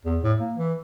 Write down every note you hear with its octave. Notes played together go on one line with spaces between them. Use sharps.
E2
A2
A#3
E3